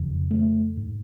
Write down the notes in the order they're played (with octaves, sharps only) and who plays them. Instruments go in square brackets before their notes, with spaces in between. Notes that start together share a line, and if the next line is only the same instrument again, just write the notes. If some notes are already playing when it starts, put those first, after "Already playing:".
Already playing: [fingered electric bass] F2 C#3
A3
G#2